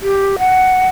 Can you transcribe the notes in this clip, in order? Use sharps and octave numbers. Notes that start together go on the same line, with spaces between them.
G4
F#5